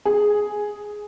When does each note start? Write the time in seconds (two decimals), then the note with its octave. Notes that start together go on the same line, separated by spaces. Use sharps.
0.05 G#4